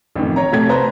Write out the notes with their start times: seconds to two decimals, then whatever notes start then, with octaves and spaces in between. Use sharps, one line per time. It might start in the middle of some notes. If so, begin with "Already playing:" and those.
0.16 A1 F2 D#3
0.36 C#5 A#5
0.52 C3 A3 G#6
0.69 B4 C5 A5 A#5